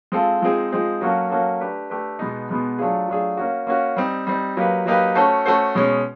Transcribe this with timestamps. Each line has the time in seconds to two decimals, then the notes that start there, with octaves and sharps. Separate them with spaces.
0.12 G#3 C4 F4 A4
0.41 F3 G#3 C4 D#4 G#4
0.72 F3 G#3 C4 D#4 G#4
1.01 F#3 A#3 C#4 F#4 A4
1.30 F#3 A#3 C#4 F#4 A4
1.60 A3 D4 G4 B4
1.90 A3 D4 G4 B4
2.19 B2 G#3 B3 D#4
2.49 B2 G#3 B3 D#4
2.78 F#3 A3 D4 F4 G#4
3.08 F#3 A3 D4 F4 G#4
3.37 A#3 C#4 F#4
3.67 A#3 C#4 F#4
3.96 G3 C4 D#4
4.27 G3 C4 D#4
4.57 F#3 A#3 D#4 G4 B4
4.86 F#3 A#3 D#4 G4 B4
5.15 A3 C#4 F#4 A4 C5
5.46 A3 C#4 F#4 A4 C5
5.75 B2 G#3 C#4